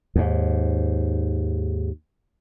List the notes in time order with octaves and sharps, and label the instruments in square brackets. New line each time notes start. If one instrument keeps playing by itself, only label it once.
[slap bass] D#2 G#2